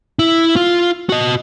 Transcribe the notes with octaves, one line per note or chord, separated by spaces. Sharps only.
E4
F4
F#4 D#5